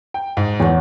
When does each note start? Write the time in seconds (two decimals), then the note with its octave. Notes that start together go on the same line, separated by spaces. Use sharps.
0.14 G5
0.37 G#2
0.60 E2 C#5 F#5